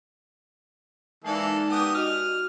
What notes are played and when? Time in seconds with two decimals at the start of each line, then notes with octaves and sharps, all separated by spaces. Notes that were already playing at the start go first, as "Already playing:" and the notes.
1.25 E3 G#3 A#3 D#4 A4 D5
1.70 B3 G4 D#6
1.95 F#4 D#5 F6